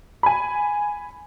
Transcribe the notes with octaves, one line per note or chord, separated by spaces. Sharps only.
G#5 B5